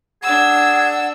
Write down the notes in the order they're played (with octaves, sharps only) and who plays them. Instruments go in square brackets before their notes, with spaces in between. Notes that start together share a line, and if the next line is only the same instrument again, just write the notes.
[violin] D4 E6 [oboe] G#4 [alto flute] F#5